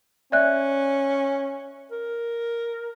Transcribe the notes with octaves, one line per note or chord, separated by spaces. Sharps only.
C#4 D5 E5 F#6
A#4